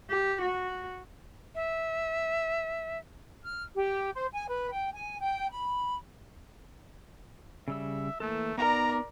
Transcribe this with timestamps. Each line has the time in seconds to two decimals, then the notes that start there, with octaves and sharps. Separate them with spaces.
0.10 G4
0.42 F#4
1.55 E5
3.44 F6
3.74 G4
4.15 C5
4.33 G#5
4.48 B4
4.73 G5
4.94 G#5
5.20 G5
5.52 B5
7.68 C#3 G3 E5 E6
8.20 E3 A3 A#3 A4
8.58 B3 D#4 A#4 D5 A#5